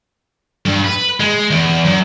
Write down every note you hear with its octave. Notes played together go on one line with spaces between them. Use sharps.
G2
B4
G#3
E2
F#2